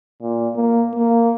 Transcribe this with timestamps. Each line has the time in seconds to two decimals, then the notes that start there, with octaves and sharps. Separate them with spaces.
0.22 A#2
0.56 A#3
0.95 A#3